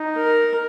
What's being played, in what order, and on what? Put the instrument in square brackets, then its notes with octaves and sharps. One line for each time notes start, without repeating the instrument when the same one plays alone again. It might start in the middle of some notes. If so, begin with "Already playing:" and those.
Already playing: [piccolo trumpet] D#4
[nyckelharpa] A#4